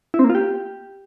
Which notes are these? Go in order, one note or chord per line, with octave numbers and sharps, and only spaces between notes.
E4
C4
A#3
F4
G4